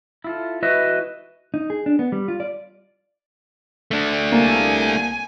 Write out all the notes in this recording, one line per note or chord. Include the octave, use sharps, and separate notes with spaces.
E4 F4 A4
E4 F#4 B4 D#5 E5
D#4
G#4
D4
B3
G3
F4
D5
A3 D4
C2 A#3 G#5 A5